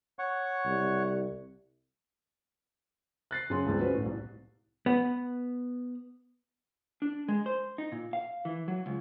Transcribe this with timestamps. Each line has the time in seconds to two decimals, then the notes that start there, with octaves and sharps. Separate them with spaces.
0.19 C#5 F#5 C#6
0.65 C2
3.31 F#6 A6 C7
3.50 F#2 C#3 G#4 C#5 C6
3.66 C#2 G2 E3 G#3 C4
3.79 C#4 F#4 G#4 B4 C5
3.94 G#1 A2
4.06 C2
4.86 B3
7.02 D4
7.28 G#3
7.46 C5
7.78 D#4
7.92 A#2
8.13 F5
8.45 E3
8.68 F#3
8.86 C#2